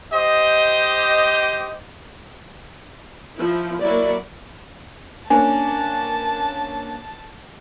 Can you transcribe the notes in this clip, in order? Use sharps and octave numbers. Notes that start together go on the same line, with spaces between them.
G4 C5 D#5
F3 E4
F#3 A#3 E4 D5
A#3 C#4 D4 G#5 A5